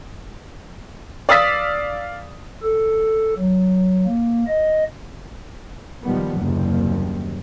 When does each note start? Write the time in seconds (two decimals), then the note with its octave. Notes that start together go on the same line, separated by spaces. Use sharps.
1.29 D5 F5 D#6 E6 A6 B6
2.63 A4
3.38 F#3
4.06 A#3
4.47 D#5
6.02 A#2 D#3 F3 G3 B3
6.37 F#1 D#2 C3 G3